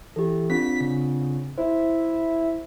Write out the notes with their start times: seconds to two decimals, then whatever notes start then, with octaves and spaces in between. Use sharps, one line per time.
0.16 E3 G4 A4
0.50 C4 D4 F4 B6
0.81 C#3
1.58 E4 C5